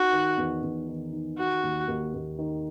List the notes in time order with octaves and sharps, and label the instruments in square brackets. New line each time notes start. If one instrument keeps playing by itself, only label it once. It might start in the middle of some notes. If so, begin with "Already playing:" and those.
Already playing: [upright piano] D#4 [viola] F#4
[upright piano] D#3
E2
E2
D#3
D#4
[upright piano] D#3 [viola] F#4
[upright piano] D#2
D#2
D#2
D#3